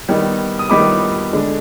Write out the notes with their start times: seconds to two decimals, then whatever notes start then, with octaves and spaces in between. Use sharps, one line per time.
0.08 D#3 G3 B3 D#4
0.59 D#6
0.70 D#3 G3 B3 D#4 B5 D6
1.33 D3 G#3 D4